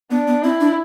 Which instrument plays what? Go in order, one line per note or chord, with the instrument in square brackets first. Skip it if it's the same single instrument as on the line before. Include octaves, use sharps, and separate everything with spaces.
[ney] B3 [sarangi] D4
[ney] B3
[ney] C4 [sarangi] E4
[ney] D4